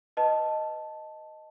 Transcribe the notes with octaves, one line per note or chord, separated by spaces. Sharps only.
B4 D#5 A5